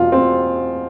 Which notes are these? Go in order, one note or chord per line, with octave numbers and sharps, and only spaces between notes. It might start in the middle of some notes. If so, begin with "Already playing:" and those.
Already playing: E2 B2 F4
C4